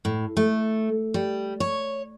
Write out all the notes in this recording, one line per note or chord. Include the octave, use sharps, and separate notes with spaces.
A2
A3
G3
C#5